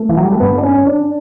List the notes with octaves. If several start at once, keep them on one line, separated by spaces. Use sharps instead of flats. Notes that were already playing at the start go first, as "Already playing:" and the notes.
Already playing: A3
E3
F#3
G3
A3
G2 D3 B3
D4
C#4
D4